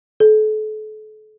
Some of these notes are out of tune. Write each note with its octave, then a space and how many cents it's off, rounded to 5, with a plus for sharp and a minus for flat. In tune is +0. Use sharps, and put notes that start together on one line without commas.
A4 -40